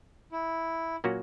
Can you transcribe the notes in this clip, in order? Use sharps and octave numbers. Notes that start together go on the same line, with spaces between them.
E4
A#2 F#3 A#3 C#4 F#4